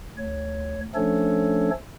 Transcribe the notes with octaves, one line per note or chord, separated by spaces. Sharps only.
D2 C#5
F3 A3 C#4 D4 A4 C#5